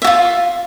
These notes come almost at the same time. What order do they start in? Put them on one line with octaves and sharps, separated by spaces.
E5 F#4 F4